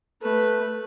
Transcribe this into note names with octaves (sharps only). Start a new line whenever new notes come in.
A3 B4